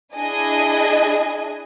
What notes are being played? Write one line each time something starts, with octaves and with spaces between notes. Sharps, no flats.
D4 E4 G#4 D#5 G#5